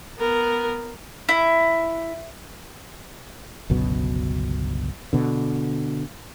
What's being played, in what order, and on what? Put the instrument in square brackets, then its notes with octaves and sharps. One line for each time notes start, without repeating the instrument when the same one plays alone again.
[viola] B3 A#4
[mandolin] E4
[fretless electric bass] G1 C#2 B2 F#3
B2 D3